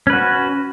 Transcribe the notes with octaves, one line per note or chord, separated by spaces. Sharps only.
C#4 F#4 B4